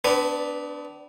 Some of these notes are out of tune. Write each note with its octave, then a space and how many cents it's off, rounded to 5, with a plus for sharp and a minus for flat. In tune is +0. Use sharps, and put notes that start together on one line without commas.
B3 +45 D4 +0 B4 +0